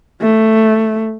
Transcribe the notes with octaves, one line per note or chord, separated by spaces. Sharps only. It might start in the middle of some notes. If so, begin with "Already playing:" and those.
A3